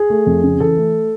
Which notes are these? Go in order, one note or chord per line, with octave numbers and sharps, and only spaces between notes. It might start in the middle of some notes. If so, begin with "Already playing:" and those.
Already playing: G#4
A3
F2
C#3
E3 A4
A3